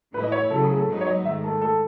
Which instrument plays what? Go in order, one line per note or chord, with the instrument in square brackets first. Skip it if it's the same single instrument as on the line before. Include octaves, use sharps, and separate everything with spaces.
[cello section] A2 E3 A3 E4 [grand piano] B4
[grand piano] D#5
C#5
[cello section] C#3 F#3 A3 [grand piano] A4
[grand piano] G#4
A4
[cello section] G#2 F#3 B3 D#4
[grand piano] C#5
D#5
[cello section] G#2 D#3 A3 [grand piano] E5
[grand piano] A4
A4